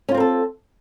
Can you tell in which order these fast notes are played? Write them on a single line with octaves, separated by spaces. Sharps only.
C#4 F4 C4 A#4 A4